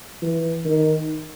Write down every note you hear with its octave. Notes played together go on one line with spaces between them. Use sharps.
E3
D#3